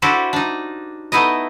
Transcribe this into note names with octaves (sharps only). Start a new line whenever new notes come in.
D4 E4 F#4 G4 A4 C5
D4 D#4
A3 B3 D#4 E4 D#5